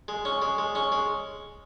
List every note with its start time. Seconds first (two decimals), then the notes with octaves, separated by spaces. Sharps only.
0.08 G#3
0.25 C#4
0.42 G#3
0.58 G#3
0.75 C#4
0.92 G#3